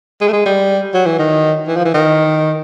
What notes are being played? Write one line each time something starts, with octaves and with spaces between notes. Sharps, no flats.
G#3
A3
G#3
G3
F#3
E3
D#3
E3
F3
E3
D#3